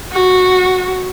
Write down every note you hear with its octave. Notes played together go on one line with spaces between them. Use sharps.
F#4